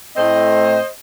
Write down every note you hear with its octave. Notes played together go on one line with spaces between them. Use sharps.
A2 A3 C4 C5 D#5